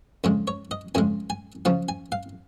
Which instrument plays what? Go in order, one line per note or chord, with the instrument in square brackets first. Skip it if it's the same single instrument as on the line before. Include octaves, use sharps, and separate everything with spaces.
[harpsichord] F2 C#3 G#3
C#5
D#5
F2 C#3 G#3 G#5
G#5
C#3 F3 C#4 F5
G#5
F5